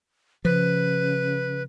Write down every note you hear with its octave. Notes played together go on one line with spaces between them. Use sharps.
C#3 F3 B4